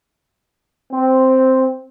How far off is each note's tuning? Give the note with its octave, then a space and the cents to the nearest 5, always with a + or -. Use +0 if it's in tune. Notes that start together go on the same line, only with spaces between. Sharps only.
C4 +0